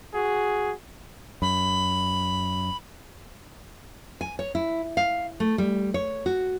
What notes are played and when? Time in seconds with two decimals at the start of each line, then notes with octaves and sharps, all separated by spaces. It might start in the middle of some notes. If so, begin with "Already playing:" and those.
0.13 F#4 G#4
1.42 F#2 B5
4.21 G#5
4.39 C#5
4.55 E4
4.97 F5
5.40 A3
5.58 G3
5.94 C#5
6.26 F#4